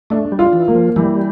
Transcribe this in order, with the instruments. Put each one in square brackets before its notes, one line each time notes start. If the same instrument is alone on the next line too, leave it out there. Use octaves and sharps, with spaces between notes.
[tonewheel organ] A3 [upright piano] D4
[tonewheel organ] G3
[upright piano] F4
[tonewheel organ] E3
[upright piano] A#3
[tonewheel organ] F3
[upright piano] E3 [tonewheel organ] G3